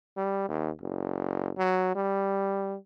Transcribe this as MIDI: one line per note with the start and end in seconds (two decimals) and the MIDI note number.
0.17 0.47 55
0.49 0.70 39
0.81 1.51 30
1.57 1.95 54
1.95 2.76 55